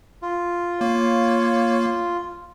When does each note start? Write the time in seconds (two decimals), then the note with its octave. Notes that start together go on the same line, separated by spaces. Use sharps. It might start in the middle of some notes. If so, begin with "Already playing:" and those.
0.22 F4
0.81 A#3 C#5